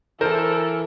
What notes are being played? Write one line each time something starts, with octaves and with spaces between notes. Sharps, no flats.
E3 A4 A#4 C5 A5